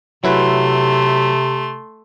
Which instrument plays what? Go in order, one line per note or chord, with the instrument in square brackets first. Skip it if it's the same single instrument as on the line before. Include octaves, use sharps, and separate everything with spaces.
[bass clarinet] C3 [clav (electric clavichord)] F#3 E4 B4 [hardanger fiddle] A3 C6